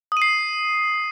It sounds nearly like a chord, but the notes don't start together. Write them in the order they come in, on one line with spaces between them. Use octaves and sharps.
D#6 D#7 C7